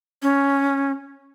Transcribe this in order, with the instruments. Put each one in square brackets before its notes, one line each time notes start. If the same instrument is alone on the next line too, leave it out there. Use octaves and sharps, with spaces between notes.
[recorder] C#4